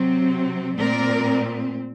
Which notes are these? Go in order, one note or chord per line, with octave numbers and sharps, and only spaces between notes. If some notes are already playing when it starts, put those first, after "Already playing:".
Already playing: C3 F#3 C4
A#2 A3 C4 A#4 D5